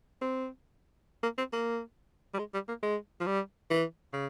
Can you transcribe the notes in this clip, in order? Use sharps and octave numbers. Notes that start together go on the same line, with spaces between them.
C4
A#3
C4
A#3
G3
G#3
G3
A#3
G#3
F3
G3
E3
C#3